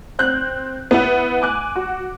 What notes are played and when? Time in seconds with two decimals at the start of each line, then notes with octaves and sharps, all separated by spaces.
0.19 C4 F#6 G6
0.91 B3 E4 F#5
1.42 G#5 D6 F#6
1.76 F#4